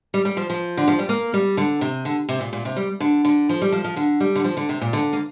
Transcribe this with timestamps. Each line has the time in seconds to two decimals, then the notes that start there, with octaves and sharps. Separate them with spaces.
0.14 G3
0.25 G3
0.37 F3
0.50 F3
0.77 D3
0.88 F3
0.99 G3
1.09 A#3
1.34 G3
1.57 D3
1.81 C3
2.05 D3
2.29 C3
2.41 A#2
2.53 A#2
2.65 C3
2.77 G3
3.00 D3
3.25 D3
3.49 F3
3.62 G3
3.72 F3
3.84 F3
3.96 D3
4.20 G3
4.35 D3
4.44 F3
4.57 D3
4.69 C3
4.81 A#2
4.93 D3
5.13 A#3